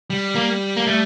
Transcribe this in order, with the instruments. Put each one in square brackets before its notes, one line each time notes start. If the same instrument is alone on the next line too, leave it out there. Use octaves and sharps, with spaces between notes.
[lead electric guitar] G3
[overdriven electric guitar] A#3
A#3
A3